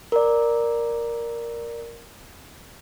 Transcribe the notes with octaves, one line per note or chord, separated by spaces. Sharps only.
A#4 D5